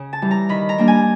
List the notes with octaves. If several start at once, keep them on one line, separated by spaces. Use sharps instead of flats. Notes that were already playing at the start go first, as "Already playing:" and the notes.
Already playing: C#3
A5
E3 G3
A#5
D#3 B5
A#5
G3 A#3 D4
G#5